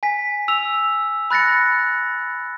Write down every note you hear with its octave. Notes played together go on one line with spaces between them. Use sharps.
G#5 B6
E6 F7
B5 F#6 A6 A#6 C#7